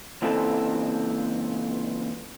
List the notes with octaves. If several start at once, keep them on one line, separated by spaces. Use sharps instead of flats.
C#2 A#2 E3 C4 A4